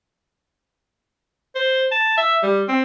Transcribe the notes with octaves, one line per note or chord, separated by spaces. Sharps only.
C5
A5
E5
G3
C4